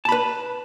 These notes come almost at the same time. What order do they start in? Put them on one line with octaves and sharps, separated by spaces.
A5 B5 B4